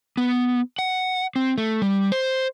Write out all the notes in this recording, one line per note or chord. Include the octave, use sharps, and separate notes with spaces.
B3
F#5
C4
A3
G3
C5